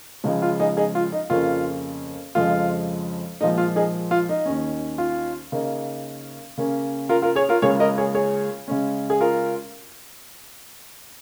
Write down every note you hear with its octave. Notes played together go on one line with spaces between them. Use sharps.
C#2 C#3 F3 G#3 D#4
F4
D#4 G#4
D#4 G#4
F4
D#4
F2 C#3 A#3 C#4 F4
F2 C#3 F3 G#3 F4
A#2 F3 G#3 D#4
F4
D#4 G#4
F4
D#4
D#2 D#3 C#4
F4
C#3 A#3 D#4
C#3 A#3 C#4
F4 A#4
F4 A#4
G#4 C#5
F4 A#4
C#2 C#3 A#3 C#4 G#4 C#5
A#4 D#5
G#4 C#5
G#4 C#5
C#3 G#3 C#4
G#4
F4 A#4